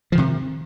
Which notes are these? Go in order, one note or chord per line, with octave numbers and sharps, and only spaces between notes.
C3 D#3 F3